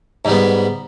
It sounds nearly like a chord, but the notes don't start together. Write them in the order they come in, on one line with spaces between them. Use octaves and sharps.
G#2 G3 B3